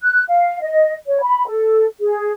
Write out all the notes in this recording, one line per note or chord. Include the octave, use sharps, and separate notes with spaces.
F#6
F5
D#5
C#5
B5
A4
G#4